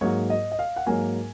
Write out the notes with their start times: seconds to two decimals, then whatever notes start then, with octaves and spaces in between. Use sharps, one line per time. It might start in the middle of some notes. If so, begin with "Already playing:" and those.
0.01 G#2 F#3 A#3 C#5
0.30 D#5
0.52 D#5
0.59 F5
0.76 F#5
0.86 G#2 F#3 A#3 G#5